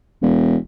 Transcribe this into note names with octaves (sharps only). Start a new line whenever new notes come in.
E1